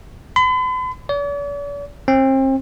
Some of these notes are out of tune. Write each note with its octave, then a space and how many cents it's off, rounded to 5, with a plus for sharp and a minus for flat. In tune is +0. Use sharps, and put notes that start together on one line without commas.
B5 +45
D5 -45
C4 +35